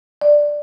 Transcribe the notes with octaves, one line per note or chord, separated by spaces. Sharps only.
D5